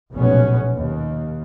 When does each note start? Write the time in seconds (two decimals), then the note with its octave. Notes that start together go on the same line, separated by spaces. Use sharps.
0.13 F1 B1 A#2 B3 C#4
0.76 D#2